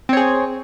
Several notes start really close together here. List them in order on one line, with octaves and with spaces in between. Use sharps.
C4 C#5 G#4